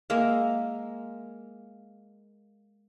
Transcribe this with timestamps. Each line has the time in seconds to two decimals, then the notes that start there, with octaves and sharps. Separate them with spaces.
0.10 G#3 A#3 E5 F5